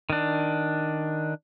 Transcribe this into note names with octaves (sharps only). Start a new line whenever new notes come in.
D#3 D4